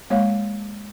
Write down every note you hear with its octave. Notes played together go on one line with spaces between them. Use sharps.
G#3 A#3 C#5 F5